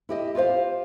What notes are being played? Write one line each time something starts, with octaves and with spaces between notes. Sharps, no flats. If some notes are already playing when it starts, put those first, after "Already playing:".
E4 G4 D#5
F4 G4 C5 F5